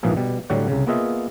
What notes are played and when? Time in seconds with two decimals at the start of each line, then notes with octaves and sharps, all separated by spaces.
0.03 A#1 G#2 E3 F3 A#3 G#4
0.17 B2 G3
0.50 A2 D3 F#3 G3 F#4 F#5
0.68 C2 C#3
0.87 A#3 B3 F4 G#4 D#5 E5